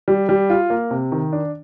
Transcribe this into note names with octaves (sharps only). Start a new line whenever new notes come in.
G3
G3
F4
A#3
C3
D#3
D4